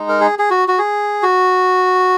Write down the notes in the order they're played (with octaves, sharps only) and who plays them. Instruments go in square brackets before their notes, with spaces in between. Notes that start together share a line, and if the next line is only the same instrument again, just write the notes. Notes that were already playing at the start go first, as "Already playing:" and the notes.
Already playing: [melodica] G#3 D#4
A#4
G#4
G#4
F#4
F#4
G#4
F#4